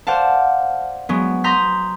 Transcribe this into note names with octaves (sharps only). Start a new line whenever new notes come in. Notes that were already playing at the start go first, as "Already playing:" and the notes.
C5 D5 F5 F#5 A5
F#3 G#3 B3
A#5 C6 D#6 G6 A#6 B6